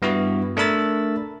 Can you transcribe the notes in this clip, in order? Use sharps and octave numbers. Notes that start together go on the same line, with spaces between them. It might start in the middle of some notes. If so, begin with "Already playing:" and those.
G2 B3 E4 F#4
A3 D4 A#4 B5 E6 A6